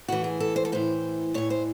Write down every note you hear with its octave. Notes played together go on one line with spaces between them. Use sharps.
A2 E3 F#4
G#4
A4
C5
A4
A2 E3 C5
A2 E3 C#5
C5